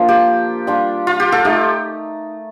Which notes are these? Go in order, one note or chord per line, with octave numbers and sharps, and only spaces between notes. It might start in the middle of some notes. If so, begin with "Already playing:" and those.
Already playing: F3 A#3 D4 F4
G4
G3 D4 F4
F4
G4
F4 A4
A3 D#4 G4